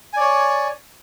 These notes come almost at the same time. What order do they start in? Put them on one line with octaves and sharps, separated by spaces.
G#5 D5 C#5